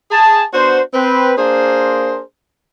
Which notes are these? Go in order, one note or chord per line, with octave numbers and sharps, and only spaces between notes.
G#4 A5
B3 D4 F#4 C5
C4 B4
A#3 D4 G#4 A#4 C5